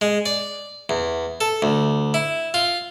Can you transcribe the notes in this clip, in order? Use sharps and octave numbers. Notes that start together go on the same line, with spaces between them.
G#3
D5
E2
A4
D2
E4
F4